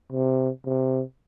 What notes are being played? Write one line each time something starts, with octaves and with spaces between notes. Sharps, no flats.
C3
C3